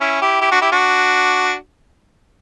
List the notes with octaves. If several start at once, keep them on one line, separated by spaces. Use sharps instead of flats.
C#4 E4
E4 G4
E4 G4
D4 F#4
E4 G4
D4 F#4